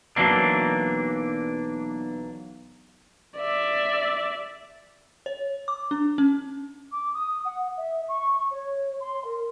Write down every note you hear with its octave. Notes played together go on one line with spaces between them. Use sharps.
B1 E3 F#3 A#3 D4 C7
D5 E5
C#5
D6
D4
C#4
D6
D#6
F#5
E5
C#6
C#5
C6
A#4